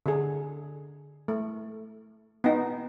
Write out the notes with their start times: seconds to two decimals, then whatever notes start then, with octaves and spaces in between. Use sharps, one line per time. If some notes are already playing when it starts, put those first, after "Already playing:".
0.06 D3 D4 G#4
1.28 A3
2.44 B3 D#4